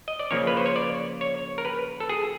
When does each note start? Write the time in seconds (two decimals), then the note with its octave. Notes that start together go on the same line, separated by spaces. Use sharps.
0.08 D#5
0.19 D5
0.31 C#3 F3 A#3 C#4 C#5
0.47 B4
0.57 C5
0.66 C#5
0.76 D5
1.21 C#5
1.58 A#4
1.65 B4
2.00 A4
2.09 G#4